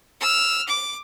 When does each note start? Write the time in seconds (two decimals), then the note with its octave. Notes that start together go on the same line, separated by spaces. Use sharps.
0.20 E6 F6
0.68 D6